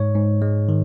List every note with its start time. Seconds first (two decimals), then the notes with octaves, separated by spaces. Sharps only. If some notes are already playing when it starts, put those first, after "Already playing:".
Already playing: G#2 C#5
0.14 G#2
0.42 G#3
0.69 D#3